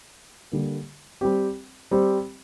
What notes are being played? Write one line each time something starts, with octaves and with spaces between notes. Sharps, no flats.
D3 G3 A#3
G3 C4 G4
G3 C4 G4